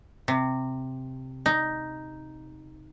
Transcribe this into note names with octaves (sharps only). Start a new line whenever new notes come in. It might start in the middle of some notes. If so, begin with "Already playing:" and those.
C3
D#4